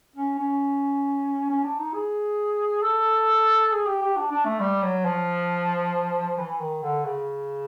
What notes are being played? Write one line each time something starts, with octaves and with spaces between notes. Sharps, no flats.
C#4
C#4
C#4
D4
D#4
G#4
A4
G#4
G4
G4
D4
D4
A3
G3
F#3
F3
E3
D#3
D3
C#3